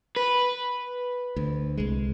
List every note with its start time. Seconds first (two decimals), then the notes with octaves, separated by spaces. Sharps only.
0.16 B4
1.36 D2
1.77 C2 G#3